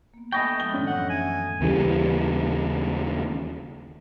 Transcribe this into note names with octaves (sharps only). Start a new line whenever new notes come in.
A#3 B3
A3 D#5 G5 G#5 B5 C#6
F3 G#3 G7
F#2 A2 D#3 C#4 D4
E3 F#3 F#5
G#5 D#6 A#6
D#2 C#3 E3 G3